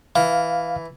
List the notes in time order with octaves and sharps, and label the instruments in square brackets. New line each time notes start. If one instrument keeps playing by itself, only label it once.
[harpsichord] E3 [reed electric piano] F5